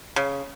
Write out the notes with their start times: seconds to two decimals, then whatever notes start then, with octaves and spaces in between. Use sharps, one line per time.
0.16 C#3